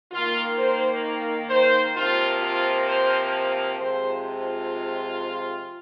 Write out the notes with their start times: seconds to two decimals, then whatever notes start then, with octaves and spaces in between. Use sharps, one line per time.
0.11 D#3 A#3 F4
0.58 C5
1.50 C5
1.95 C3 F3 A#3 F4
2.41 F4
2.87 C5
3.79 C3 F3 G#3 C5
4.24 F4